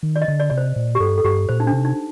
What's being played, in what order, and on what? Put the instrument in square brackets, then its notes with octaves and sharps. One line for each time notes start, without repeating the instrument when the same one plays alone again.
[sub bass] D#3
[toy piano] D5
D#5
[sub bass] D3
[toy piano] D5
[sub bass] C3 [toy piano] D5
[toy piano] C5
[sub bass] A#2
[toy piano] G4
[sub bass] G2 [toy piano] A4
[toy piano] A4
[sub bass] G2 [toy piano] G4
[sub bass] A#2 [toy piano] C5
[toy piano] D#4
D4
[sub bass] C3
[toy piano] D#4